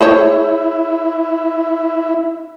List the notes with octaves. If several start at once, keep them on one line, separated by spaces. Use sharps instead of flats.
E4 G#4 C5 C#5